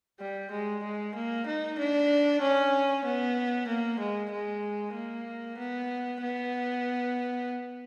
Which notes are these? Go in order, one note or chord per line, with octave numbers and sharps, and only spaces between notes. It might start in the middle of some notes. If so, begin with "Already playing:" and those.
G3
G#3
G#3
A#3
D#4
D4
C#4
B3
A#3
G#3
G#3
A#3
B3
B3